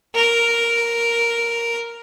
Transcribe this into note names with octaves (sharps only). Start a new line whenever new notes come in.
A#4